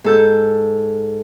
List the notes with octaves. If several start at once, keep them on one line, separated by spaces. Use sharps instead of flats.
G#2 A4 G6